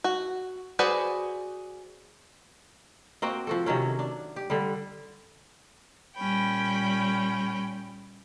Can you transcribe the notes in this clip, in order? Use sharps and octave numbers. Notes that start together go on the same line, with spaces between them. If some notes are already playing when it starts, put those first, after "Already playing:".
F#4
F#4 G#4 B4 C5 D5
A#3 C4 F#4 G5
F3 F#4 A4
C3 D#3 F#3 C#4
D4
G4
D3 G3
A#2 G3 C#4 G5 B5